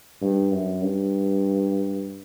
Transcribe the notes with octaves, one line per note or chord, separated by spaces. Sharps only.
G2
F#2
G2